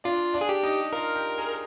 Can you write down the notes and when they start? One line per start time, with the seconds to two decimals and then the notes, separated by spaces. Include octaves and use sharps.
0.04 D4 F4 D5
0.34 D4 D5
0.41 G#4
0.49 G4
0.63 D#4 D#5
0.93 F4 A#4 F5
1.15 G4 G5
1.38 G#4 G#5